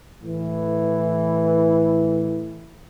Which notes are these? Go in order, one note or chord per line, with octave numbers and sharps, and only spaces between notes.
A2 E3